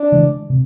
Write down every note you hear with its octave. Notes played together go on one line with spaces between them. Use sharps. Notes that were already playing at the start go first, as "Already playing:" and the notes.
Already playing: D4
C#3 E3 G#3
C3